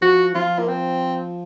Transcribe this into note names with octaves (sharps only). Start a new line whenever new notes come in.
F3 F#4
F3 F4
A#3
C4